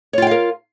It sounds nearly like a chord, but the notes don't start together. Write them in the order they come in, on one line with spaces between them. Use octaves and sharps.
C#5 F4 G5 F5 A#4